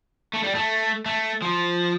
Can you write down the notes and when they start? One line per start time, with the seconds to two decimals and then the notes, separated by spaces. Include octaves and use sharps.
0.34 A3
0.43 G3
0.55 A3
1.06 A3
1.42 F3